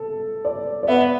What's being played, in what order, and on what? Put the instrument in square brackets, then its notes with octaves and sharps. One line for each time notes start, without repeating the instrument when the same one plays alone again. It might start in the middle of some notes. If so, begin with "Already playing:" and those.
Already playing: [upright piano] A4
D5
D5
[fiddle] B3 [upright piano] E5